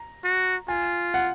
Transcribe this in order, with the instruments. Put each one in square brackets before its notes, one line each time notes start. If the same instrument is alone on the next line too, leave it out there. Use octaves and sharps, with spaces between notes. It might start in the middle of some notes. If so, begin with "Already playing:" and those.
Already playing: [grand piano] A#5
[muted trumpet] F#4
[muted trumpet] F4 [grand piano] G#5
[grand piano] F#5